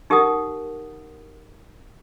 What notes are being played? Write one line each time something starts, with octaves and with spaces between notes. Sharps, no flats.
D#4 G4 A#4 F#5 D#6